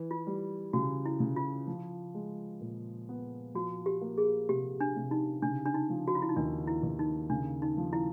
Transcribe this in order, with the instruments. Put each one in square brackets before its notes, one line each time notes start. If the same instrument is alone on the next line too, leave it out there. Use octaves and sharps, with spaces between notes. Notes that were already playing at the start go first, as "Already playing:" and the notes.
Already playing: [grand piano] E3
[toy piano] F4
[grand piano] G3
[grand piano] C#3 [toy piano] F#4
[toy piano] E4
[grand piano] C#3
[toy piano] F4
[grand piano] F3
G#3
A#2
B3
[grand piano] F3 [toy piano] F#4
[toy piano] G4
[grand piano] A#3
[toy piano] G#4
[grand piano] C3 [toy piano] G4
[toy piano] D4
[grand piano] C3
[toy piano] D#4
[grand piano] C#3 [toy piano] D4
[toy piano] D4
D#4
[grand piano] F3
[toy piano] F#4
F4
E4
D#4
[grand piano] D#2 [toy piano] D4
[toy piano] E4
[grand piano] D#2
[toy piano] D#4
[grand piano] C#3 [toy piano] D4
[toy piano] D#4
[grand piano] F3
[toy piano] E4